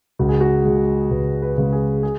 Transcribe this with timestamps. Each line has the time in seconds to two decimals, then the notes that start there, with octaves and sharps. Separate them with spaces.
0.19 C#2 F#4
0.29 G#4
0.41 F#4
0.65 C#3 G#3
1.11 C#2 B4
1.42 B4
1.58 C#3 G#3
1.73 G#4
2.03 G#4